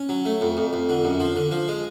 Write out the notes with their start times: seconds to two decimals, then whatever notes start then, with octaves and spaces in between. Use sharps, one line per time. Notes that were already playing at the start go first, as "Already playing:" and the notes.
Already playing: C#4
0.09 F#3
0.25 A3
0.41 F2
0.57 F2
0.73 F2
0.89 D3
1.04 F#2
1.20 F3
1.36 D3
1.51 F3
1.68 G#3